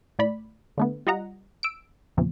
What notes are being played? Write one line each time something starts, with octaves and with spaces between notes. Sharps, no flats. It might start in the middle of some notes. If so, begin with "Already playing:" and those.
A2 D5 B5
D3 A3 B3
G3 F4 D#5 F#5 A#5
E6 D7
E2 A#2 C#3 F3